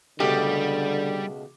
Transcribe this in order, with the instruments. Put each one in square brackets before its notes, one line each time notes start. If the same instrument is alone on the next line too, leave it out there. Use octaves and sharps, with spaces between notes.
[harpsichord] C#2 B2 A3 [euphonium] D3 [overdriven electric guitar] G3 [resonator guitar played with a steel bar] G4